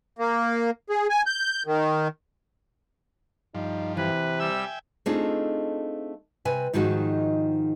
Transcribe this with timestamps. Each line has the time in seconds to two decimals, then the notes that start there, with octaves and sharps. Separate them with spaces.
0.19 A#3
0.90 G#4
1.10 G#5
1.26 G6
1.66 D#3
3.55 G2 F3 D#4
3.97 C3 E3 B4
4.40 G3 E5 G5 G#5 E6
5.06 A3 C4 D4 D#4 F4 G#4
6.45 C3 B4 G#5
6.73 G#2 D#3 F3 D#4 F#4 G#4